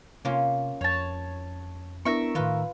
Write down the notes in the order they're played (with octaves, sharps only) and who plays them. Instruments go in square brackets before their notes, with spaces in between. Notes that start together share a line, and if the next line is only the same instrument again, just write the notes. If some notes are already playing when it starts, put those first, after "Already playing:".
[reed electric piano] C3 [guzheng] A#3 C#4 F4
[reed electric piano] F2 [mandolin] C#5 A5
[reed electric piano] B3 D4 E4 [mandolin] A#4 E5 C#6
[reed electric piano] A2 D#3 [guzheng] F4 B4